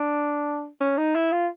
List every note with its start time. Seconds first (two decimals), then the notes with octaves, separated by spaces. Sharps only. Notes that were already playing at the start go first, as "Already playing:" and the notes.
Already playing: D4
0.80 C#4
0.98 D#4
1.15 E4
1.32 F4